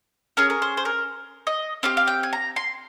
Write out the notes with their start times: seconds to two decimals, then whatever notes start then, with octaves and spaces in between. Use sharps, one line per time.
0.37 C#4 G#4 A#4
0.50 A#4
0.62 C5
0.77 C5
0.85 A#4
1.47 D#5
1.83 C4 G4 F5
1.97 F5
2.07 G5
2.23 G#5
2.33 A#5
2.56 C6